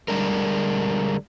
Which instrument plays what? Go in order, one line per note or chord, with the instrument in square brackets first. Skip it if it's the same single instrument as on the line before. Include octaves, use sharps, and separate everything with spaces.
[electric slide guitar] D3 G3 G#3 D4 A#4